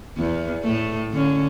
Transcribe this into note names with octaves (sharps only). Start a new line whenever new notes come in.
E2
A2 A3
D3 C#4